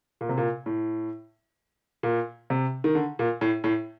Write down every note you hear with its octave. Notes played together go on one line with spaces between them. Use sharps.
A#2
C3
A#2
A2
A#2
C3
D#3
D3
A#2
A2
A2